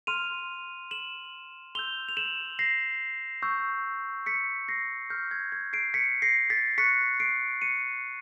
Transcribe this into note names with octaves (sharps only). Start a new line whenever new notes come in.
C6 F6 D#7 F7
E7 F#7
C6 E6 G6 F7 G7
F7
E7 F#7
A#6 C7
C#6 E6 G6
B6 C#7
A#6 C7
C#6 F6 G6
G#6
G#6
C7 D7
B6 C#7
A#6 C7
A6 B6
C#6 F#6 B6 C#7
C7 D7
C#7 D#7